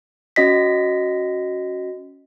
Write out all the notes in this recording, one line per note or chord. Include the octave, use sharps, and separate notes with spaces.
C#4 F#4 D#5 A#6 B6